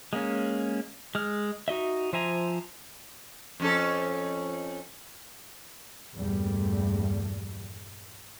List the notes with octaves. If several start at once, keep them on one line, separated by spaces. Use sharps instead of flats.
G#3 A#3 C#4
G#3 F6
D#4 F#4 D#5 E5
F3 C5 E5 G#5 A#5
F2 C#4 A4
A#1 E2 G2 G3 A3